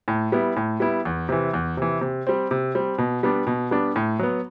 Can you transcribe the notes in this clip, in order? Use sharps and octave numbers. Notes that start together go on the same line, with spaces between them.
A2
G3 B3 E4
A2
G3 B3 E4
E2
C3 E3
E2
C3 E3
C3
G3 C4
C3
G3 C4
B2
G3 B3 D4
B2
G3 B3 D4
A2
F#3 B3